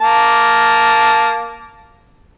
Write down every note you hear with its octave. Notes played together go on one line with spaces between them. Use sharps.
A#3 A5